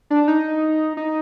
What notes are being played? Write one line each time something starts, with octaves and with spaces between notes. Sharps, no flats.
D4
D#4
D#4